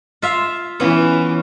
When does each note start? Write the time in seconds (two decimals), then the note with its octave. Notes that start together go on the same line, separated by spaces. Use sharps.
0.22 F4 E5 F5
0.80 E3 B3 C#4